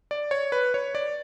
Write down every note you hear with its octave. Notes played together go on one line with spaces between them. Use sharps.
D5
C#5
B4
C#5
D5